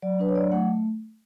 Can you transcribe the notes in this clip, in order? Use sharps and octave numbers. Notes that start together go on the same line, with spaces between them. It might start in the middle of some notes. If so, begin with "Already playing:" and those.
F#3 D5
D4 B4
C#5
F#3 D5
A3 F#5